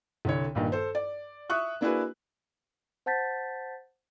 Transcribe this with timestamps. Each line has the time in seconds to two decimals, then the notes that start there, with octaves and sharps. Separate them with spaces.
0.25 C2 D3 C#5
0.55 A#1 G2 D#3
0.72 A4 C5
0.95 D5
1.50 E5 C#6 D#6 F#6
1.81 A#3 D4 E4 F#4 G#4 B4
3.06 C5 F#5 A5 G6 A6 B6